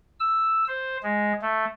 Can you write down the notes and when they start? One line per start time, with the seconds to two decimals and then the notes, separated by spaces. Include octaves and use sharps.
0.20 E6
0.68 C5
1.03 G#3
1.42 A3